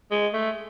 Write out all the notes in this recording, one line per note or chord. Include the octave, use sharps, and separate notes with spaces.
G#3
A3